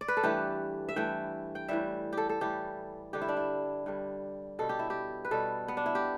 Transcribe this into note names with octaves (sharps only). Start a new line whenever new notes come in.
D5
B4
A4
G2 E3 A3 G4
E5
G2 E3 A3 G5
G5
A2 E3 G3 E5
G4 A4
A4
A2 E3 G3 G4
G2 D3 G3 G4
E4
D4
E4
G2 D3 G3
B2 G3 A4
G4
E4
G4
B4
B2 G3 A4
B3
D4
E4
G4